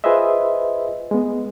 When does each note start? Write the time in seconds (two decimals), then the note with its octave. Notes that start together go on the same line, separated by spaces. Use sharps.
0.04 F4 G#4 B4 C5 D#5 E5
1.11 G#3 B3